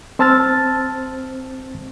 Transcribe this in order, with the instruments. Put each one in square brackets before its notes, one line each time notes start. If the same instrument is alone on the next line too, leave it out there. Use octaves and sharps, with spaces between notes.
[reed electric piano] C4 C5 A5 E6 F6 A6